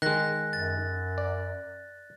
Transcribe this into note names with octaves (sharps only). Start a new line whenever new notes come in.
D#3 G#3 F#6 A#6
F#2 A6
D5